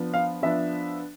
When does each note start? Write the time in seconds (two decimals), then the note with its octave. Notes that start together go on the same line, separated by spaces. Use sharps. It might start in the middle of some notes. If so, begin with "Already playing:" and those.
Already playing: F3 B3 D4
0.14 F5
0.43 F3 B3 D4 E5